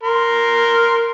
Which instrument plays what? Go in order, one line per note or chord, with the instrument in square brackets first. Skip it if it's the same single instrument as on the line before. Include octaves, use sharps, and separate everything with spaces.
[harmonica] A#4 C6